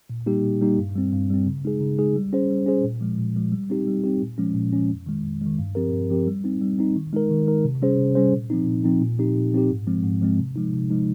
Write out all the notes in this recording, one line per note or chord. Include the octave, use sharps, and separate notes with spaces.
A#2
G3 A#3 D#4 G4
A#2
G3 A#3 D#4 G4
G2
G3 C4
G2
G3 C4
C#3
G#3 D#4 G#4
C#3
G#3 D#4 G#4
G3
C#4 G#4 C5
G3
C#4 G#4 C5
A#2
F3 G#3
A#2
F3 G#3
G3
C4 D#4 G4
G3
C4 D#4 G4
A#2
F3 G#3 C#4
A#2
F3 G#3 C#4
F2
D#3 G#3
F2
D#3 G#3
G2
F3 C4 G4 A#4
G2
F3 C4 G4 A#4
G3
C4 D#4
G3
C4 D#4
D#3
G#3 D#4 A#4
D#3
G#3 D#4 A#4
C3
G3 C#4 G#4 C5
C3
G3 C#4 G#4 C5
A#2
F3 C4 D#4
A#2
F3 C4 D#4
A#2
F3 C4 D#4 G4
A#2
F3 C4 D#4 G4
G#2
F3 G#3 C4
G#2
F3 G#3 C4
C3
F3 G#3 D#4
C3
F3 G#3 D#4